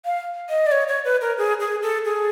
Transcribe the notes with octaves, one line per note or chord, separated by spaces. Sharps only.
F5
D#5
D5
C#5
C#5
B4
A#4
G#4
G#4
A4
G#4